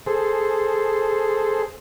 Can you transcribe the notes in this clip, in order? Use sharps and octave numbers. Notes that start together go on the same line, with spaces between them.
G#4 A4 C5